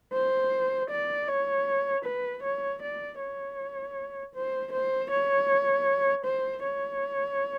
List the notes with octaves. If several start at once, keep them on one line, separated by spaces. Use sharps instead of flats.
C5
D5
C#5
B4
C#5
D5
C#5
C5
C5
C#5
C5
C#5